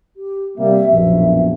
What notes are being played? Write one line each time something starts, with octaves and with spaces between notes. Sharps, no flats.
G4
C3 G3 A#3 E5
A#1 F#2 B2 E5